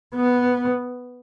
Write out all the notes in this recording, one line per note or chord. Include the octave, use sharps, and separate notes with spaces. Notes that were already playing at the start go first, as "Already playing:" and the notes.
B3